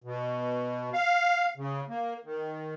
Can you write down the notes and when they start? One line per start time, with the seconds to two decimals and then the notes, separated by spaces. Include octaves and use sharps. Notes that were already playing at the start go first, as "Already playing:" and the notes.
0.04 B2
0.93 F5
1.57 C#3
1.89 A#3
2.24 D#3